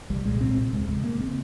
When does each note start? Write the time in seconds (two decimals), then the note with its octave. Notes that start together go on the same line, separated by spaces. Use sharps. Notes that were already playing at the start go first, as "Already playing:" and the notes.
0.10 C2 G3
0.25 A#2 G#3
0.41 A#2 C4
0.57 C2
0.73 D#2 G#3
0.88 C#3 G#3
1.04 C#3 A#3
1.20 C4